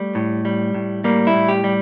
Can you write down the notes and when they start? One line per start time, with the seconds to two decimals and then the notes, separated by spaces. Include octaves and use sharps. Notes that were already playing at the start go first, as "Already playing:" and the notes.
Already playing: G3 A3
0.15 A2
0.45 G3
0.74 A2
1.04 G3 A#3
1.27 E4
1.34 A2
1.49 G4
1.64 G3